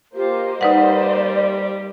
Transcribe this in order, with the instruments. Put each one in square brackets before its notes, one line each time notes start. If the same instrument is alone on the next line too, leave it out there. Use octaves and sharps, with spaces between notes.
[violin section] A#3 C5 D#5 [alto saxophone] F4 [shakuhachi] G4
[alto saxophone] G3 [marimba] D#4 B4 F#5 [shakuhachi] D5